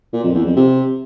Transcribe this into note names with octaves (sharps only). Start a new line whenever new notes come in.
A#2
F2
E2
F2
C3